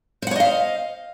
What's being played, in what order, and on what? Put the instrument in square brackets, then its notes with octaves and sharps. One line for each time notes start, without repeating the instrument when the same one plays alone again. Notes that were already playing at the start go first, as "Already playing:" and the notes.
[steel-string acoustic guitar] C5
F#5
C#5
D#5
F5